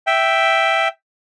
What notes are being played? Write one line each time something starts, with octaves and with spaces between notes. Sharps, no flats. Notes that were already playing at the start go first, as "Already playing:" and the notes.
E5 G5